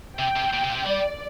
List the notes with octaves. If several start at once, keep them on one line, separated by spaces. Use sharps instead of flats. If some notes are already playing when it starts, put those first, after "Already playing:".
C3 G5
C3
A#2
C3
A#2
C3
G3 D5